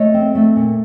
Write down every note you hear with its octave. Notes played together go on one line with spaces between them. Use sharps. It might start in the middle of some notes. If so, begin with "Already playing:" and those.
Already playing: A3 C#5 D#5
C4
A3
A#2